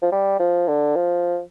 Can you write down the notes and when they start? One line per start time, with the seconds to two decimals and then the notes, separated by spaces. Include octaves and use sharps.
0.02 F3
0.12 G3
0.39 F3
0.68 D3
0.96 F3